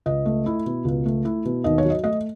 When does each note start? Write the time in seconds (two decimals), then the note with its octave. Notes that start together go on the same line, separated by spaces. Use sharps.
0.06 C#2 D#5
0.25 A3
0.46 E4
0.66 B2
0.85 C#2
1.06 A3
1.25 E4
1.45 B2
1.64 D#2 D#5
1.78 C#5
1.85 F#3
1.90 D#5
2.04 A3 D#5